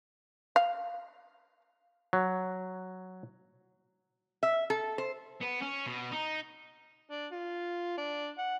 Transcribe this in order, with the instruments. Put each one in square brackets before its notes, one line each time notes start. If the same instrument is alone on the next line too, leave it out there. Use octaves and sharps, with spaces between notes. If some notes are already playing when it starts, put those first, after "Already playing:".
[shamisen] F5
[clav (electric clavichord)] F#3
[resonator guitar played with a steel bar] E5
A4
C5
[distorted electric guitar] B3
C#4
B2
D#4
[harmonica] D4
F4
D4
F#5